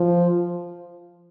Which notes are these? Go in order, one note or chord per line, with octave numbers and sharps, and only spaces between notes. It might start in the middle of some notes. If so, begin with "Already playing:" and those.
Already playing: F3